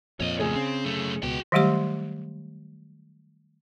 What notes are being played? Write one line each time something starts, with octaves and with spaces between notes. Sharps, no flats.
F2 A#2 C#5 D#5
C#3 A3 G#4
C#3 C4
F#2 A3
C#2 B2 F#4 G5
D#3 F#3 G3 A3 G4 C6